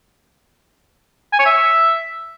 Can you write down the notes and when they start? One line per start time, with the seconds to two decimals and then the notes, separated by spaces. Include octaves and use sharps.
1.33 G#5
1.39 C#5
1.46 E5